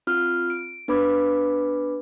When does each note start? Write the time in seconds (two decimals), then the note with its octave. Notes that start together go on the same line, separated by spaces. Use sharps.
0.07 C4 F4 F6
0.50 D7
0.88 B3 D4 B4 B5 D6 G#6